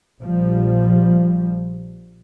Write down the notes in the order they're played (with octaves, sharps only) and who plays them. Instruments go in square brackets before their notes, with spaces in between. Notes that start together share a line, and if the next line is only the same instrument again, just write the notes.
[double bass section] A#1 F3 G3